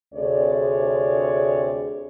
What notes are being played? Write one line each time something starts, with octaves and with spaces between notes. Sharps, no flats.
D2 C3 G#4 C#5 D5